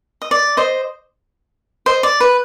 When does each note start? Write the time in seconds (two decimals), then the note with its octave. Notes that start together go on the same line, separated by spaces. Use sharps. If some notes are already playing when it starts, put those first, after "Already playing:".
0.22 D#5
0.31 D5
0.57 C5 D#5
1.86 C5 D#5
2.03 D5
2.20 B4